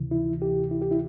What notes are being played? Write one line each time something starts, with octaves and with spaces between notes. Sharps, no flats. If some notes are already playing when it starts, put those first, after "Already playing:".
Already playing: D2 C3 E3
E4
G4
E4
G4
E4